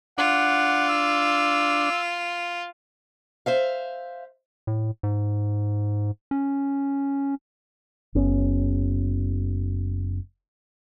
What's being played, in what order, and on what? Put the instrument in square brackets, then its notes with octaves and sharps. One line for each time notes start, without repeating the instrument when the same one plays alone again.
[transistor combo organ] D4 [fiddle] F4 [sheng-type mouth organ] F#5
[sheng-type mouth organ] E6
[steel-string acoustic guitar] C5 E5 F5
[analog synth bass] A2
G#2
C#4
[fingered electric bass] F#1 B3 C#4